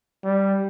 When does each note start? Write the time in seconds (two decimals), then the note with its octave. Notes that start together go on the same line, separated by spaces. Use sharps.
0.24 G3